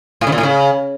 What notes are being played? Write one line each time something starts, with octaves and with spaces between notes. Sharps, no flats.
A2
C#3
A#2
A2
C#3